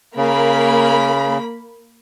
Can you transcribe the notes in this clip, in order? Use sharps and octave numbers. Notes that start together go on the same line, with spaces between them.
C#3 A#3 B5